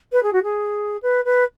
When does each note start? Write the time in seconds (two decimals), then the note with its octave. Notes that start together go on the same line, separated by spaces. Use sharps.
0.12 B4
0.23 G#4
0.33 F#4
0.43 G#4
1.03 B4
1.25 B4